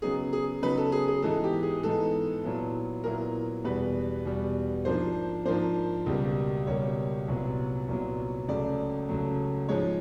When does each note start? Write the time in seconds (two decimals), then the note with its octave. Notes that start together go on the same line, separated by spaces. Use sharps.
0.02 C#3 F#3 B3 D#4 G#4
0.33 G#4
0.62 C#3 F#3 B3 D#4 B4
0.78 A4
0.92 G#4
1.08 G#4
1.22 G#2 E3 G#3 B3 D#4 A4
1.44 G4
1.63 G#4
1.83 G#2 E3 G#3 B3 D#4 A4
2.43 A#2 F#3 B3 E4
3.04 A#2 F#3 B3 E4 A#4
3.64 E2 B2 G3 B3 B4
4.25 E2 B2 G3 B3
4.85 G#2 F3 A#3 D4 C5
5.45 G#2 F3 A#3 D4 C5
6.06 C#2 B2 G3 A#3
6.67 C#2 B2 G3 A#3 C#5
7.28 C2 A#2 F#3 B3
7.88 C2 A#2 F#3 B3
8.48 C#2 C#3 F#3 A3 D5
9.09 C#2 C#3 F#3 A3
9.69 G#2 F3 G#3 C#5